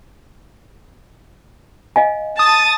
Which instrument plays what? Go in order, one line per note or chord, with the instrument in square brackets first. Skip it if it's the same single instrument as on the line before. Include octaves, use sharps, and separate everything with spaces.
[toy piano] D#5 F5 G#5
[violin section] A5 A6 [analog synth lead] D#6